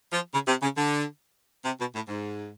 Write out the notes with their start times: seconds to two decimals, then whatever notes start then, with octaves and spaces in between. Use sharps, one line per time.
0.11 F3
0.32 C#3
0.47 C3
0.62 C#3
0.76 D3
1.64 C3
1.79 B2
1.94 A2
2.08 G#2